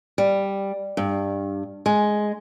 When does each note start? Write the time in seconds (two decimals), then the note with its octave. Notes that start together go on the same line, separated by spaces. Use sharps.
0.18 G3
0.97 G2
1.86 G#3